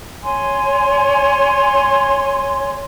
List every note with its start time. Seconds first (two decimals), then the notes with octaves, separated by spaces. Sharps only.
0.24 C#5 G#5 C6